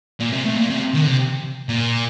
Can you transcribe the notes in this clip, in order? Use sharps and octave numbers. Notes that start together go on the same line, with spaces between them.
A#2
C3
A2
A#2
C3
D#3
D3
C3
A#2